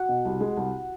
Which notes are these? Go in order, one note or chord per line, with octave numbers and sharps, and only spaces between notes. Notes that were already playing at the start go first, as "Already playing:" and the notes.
Already playing: F#4 F#5
B2
C2
G#3
C2